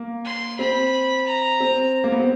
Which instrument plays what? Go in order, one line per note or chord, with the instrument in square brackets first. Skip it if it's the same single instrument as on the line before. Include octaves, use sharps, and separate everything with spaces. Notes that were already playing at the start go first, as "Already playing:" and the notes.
Already playing: [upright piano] A#3
[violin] C6
[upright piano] C4 [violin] B5
[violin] A#5
[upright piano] C4
A#3
B3
C4